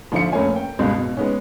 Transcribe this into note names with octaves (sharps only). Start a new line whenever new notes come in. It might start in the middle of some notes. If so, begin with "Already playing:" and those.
A#1 D3 F3 F4 E5 C#7
F1 A3 A#3 C#4 C#5 G#5
G5
C#2 G2 B2 G#3
B2
G#3 B3 C#4